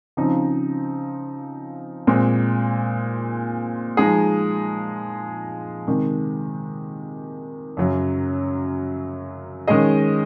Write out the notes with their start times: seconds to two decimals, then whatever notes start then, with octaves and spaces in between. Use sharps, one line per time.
0.17 C#3 F3 C4 D#4
2.07 A#2 G#3 C4
3.97 F3 G#3 D#4 G#4
5.87 C3 D#3 G#3
7.77 F#2 C#3 F#3
9.68 D#3 G#3 C#4 G#4 D#5